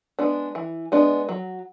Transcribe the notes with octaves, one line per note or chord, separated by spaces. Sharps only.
G#3 B3 D4
E3
G#3 B3 D4
F#3